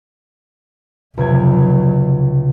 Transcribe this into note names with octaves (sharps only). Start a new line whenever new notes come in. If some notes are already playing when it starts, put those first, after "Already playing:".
F1 C#2 C3 F#3 G#6